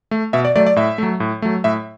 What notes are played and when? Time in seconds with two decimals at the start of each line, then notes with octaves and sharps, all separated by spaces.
0.11 A3
0.33 B2 E5
0.45 D5
0.56 F#3 A3 D5
0.66 D5
0.76 A2 E5
0.98 F#3 A3
1.20 A2
1.42 F#3 A3
1.64 A2 E5